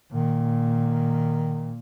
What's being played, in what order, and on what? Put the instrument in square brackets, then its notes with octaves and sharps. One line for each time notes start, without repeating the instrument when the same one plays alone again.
[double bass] A#2 [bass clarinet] D#3